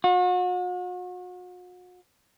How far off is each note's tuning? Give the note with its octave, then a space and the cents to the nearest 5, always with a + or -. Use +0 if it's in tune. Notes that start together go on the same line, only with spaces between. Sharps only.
F#4 -40